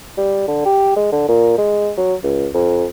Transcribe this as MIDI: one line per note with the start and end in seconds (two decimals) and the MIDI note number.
0.17 0.43 55
0.48 0.61 50
0.65 0.94 67
0.96 1.09 56
1.12 1.25 50
1.28 1.56 46
1.58 1.91 56
1.97 2.14 54
2.23 2.47 37
2.54 2.85 41